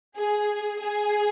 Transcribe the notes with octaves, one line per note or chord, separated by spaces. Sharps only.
G#4
G#4